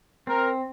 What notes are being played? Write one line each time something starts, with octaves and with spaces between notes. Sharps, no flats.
C4 A#4